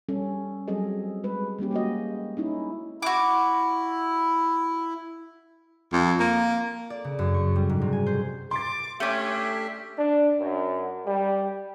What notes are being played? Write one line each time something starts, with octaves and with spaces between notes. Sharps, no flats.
G3 C#4 A4
F#3 G3 C4 G#4 A4 D#5
G3 G#3 B4
G3 A#3 C#4 G4
G#3 A#3 F#4 D#5
C#4 D#4 E4
E4 F#4 D6
F2
A#3
D5
C#3
F#2
C#6
G3
G#2
C3
G#5
C5
C6 D6 A6
A3 C#4 D4 G4 E5
D4
F#2
G3